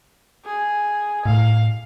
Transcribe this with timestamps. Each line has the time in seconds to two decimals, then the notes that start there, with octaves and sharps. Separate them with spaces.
0.45 G#4
1.26 A2 F5